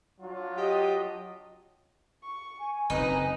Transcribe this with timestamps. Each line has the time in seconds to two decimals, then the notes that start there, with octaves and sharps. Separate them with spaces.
0.21 F#3 D4 F4
0.58 G4 D#5
2.23 C#6
2.58 G#5
2.90 F#1 C4 D#4 B4